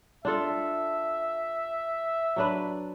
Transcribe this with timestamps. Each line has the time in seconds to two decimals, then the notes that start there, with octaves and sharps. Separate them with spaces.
0.25 D4 F4 A4 E5
2.36 F#3 D4 B4